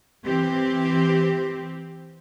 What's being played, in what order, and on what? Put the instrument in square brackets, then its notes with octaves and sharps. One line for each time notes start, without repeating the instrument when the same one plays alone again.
[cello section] E3 C4 G4